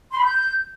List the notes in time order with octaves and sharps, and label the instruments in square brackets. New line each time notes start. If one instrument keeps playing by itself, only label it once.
[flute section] C6
B5
G6